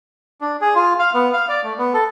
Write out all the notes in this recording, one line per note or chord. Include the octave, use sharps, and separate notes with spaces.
D4
G#4
F4
F5
B3
F5
D5
A3
B3
A4